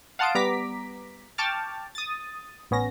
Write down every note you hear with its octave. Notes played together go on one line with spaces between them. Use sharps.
F5 F#5 A5 C6 D#6 D7
G3 B3 A#5 D6 B6
G5 A5 C#6 D6 F6 A6
D#6 A6
A1 B3 C#4 A#6